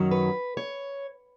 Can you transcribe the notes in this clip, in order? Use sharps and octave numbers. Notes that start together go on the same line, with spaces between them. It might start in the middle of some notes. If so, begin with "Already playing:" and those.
Already playing: F#2 D#3 F#3 C#4
B4
C#5